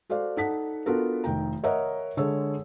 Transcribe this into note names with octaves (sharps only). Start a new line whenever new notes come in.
F#4 A4 C5 D5 F5
D#4 A4 F#5 A5 B6
B3 D4 F4 F#4 A4 A#4
F1 D#3 G5 A#5
A#4 C#5 D#5 E5 F#5 A#5
D3 G#3 A4 C#5 E6